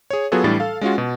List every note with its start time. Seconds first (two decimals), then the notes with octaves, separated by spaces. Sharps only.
0.10 G#4 C#5
0.32 F#3 B3 F4 F#4 G#4 A4
0.44 A2 E3 G3 D4 A6
0.60 A4 F5
0.81 G#3 C#4 F4 F#4
0.98 B2